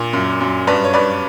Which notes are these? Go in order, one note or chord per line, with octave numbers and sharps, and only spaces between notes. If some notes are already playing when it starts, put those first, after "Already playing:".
Already playing: A#2
F#2
F#2
G2 B4 D5
C#5
G2 B4 D5